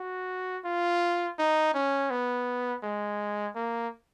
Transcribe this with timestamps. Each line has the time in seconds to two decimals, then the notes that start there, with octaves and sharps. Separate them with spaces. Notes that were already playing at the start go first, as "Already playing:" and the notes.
Already playing: F#4
0.65 F4
1.39 D#4
1.74 C#4
2.10 B3
2.83 G#3
3.55 A#3